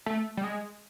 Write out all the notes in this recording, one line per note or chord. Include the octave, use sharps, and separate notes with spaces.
A3
G3
G#3